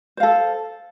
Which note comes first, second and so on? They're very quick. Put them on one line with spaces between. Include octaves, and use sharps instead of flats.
C5 F5 A4